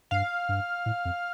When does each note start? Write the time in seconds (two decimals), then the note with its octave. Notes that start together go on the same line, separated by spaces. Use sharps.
0.11 G2 F5
0.49 G2
0.86 A2
1.05 F2